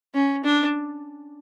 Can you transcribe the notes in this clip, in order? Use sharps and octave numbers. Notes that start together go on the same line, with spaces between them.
C#4
D4